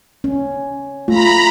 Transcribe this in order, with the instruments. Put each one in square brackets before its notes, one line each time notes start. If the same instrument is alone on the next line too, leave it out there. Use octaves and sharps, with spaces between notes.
[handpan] C#4
[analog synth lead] A3 [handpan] F4 [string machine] A#5 B5